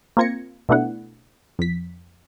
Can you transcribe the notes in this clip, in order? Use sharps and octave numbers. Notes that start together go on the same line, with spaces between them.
A#3 C4 F4 G#6 A#6 C#7
B2 A3 B3 D4 E4 F#5
F2 B6